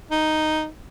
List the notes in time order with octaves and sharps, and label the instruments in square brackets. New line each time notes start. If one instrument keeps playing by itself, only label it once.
[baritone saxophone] D#4